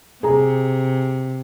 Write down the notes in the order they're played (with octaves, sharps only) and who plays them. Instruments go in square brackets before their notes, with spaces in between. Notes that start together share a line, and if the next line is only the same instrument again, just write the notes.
[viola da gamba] C3 [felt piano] G#4 A#5